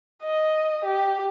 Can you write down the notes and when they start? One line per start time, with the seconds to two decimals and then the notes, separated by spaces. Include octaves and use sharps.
0.23 D#5
0.84 G4